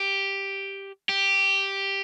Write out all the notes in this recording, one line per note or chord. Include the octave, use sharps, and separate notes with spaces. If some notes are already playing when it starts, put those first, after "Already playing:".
Already playing: G4
G4